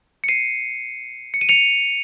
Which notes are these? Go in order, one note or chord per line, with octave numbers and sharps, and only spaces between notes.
C#7
C7 D#7
C#7
D#7
C#7 F7